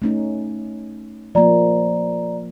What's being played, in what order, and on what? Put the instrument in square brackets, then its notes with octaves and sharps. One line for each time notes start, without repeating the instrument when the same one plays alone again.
[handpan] A3 C#4 D#4
[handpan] F3 A#3 [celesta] D5 A#5